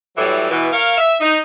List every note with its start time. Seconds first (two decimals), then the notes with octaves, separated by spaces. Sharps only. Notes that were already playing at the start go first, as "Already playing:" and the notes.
0.16 A2 E3 F#3 G3
0.51 B2 E3
0.72 A#4 C#5 F5
0.97 E5
1.21 D#4